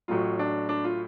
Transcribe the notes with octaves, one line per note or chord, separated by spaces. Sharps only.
A1 A2 F#3 F4
D4
D4
F4